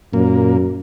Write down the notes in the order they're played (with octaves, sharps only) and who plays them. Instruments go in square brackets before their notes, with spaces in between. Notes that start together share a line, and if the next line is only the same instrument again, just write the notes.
[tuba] F#2 [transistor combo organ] A#2 A#3